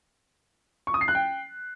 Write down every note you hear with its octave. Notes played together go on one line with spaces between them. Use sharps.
C#6
D#6
C7
F#6
G5